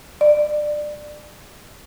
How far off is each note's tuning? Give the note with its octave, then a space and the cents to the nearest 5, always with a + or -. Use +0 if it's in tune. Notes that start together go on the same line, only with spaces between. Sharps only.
D5 +20